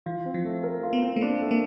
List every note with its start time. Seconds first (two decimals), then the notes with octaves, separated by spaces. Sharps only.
0.06 E3 F4
0.25 C4
0.34 F3
0.45 A3
0.63 A#4
0.83 F4
0.93 B3
1.02 C4
1.16 A3
1.21 A#3 D4
1.41 A3
1.51 A#3